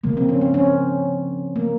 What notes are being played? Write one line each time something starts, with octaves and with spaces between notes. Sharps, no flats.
C#3 F3 G#3 A#3
C4
C#4
C4
C#4
A#3